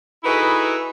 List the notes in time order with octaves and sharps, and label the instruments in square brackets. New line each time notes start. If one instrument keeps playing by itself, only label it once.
[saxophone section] D#4 E4 F#4 G#4 A4 B4